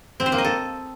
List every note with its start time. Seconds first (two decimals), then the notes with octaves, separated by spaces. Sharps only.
0.20 C4
0.26 C5
0.32 A#3
0.38 D#5
0.45 A4